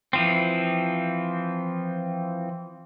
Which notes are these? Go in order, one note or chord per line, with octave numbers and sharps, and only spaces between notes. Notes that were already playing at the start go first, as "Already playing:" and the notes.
E3 F3 C4